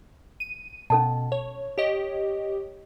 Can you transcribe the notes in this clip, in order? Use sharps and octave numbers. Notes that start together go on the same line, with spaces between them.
D#7
B2 C#4 A4 A5
C#5
G4 C#5 D#5